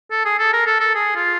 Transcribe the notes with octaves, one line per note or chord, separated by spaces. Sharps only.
A4
G#4
A4
A#4
A4
A4
G#4
F4